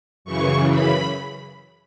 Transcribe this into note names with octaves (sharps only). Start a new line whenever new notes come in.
F#2 C#3 E3 C#6
B5